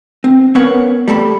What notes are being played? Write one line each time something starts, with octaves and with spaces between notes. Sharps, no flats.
C4
B3 C#4 A#4 B4 C#5 F#5
G3 A3 A4 B5